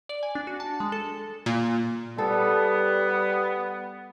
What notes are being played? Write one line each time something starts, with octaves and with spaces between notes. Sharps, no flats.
D5
G#5
D4
F#4
A5
G#3
A4
A#2
G3 B3 A4